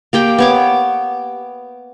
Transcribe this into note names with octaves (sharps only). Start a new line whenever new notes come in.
A#3 G4 G5
B3 C#5 D6